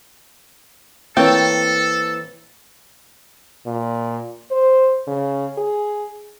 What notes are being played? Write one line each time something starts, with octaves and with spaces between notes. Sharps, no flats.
E3 A#3 C4 A4 C#5 G5
A#2
C5
C#3
G#4